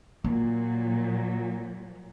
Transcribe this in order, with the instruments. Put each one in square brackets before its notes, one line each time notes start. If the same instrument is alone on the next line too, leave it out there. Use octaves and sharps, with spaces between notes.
[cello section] A#2 F#3 [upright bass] A#3